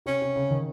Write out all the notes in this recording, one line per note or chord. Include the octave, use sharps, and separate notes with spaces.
C3 C#4
C3
C#3
D#3